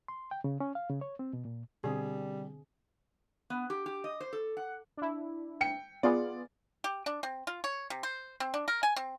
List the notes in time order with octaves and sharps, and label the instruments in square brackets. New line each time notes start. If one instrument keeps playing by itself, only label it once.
[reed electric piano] C6
G5
C#3
C#4
F5
C#3
C#5
C4
B2
A#2
[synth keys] B2 D3 C4 [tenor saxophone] G3 [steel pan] G#4
[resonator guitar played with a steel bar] B3
G4
G4
D#5
C5
A4
F#5
[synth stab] D4 E4
[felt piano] G5 C#7
[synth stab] B3 F4 G#4 [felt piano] D5
[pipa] G4
D4
C4
F4
C#5
C3
C5
C4
D4
A#4
G#5
C4